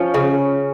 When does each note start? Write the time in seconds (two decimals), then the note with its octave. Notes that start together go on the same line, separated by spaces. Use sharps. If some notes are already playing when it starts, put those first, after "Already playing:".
Already playing: F3 C#4
0.14 C#3